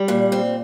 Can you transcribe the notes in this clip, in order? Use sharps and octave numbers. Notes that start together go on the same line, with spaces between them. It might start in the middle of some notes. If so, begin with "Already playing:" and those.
Already playing: G3
A#2
C4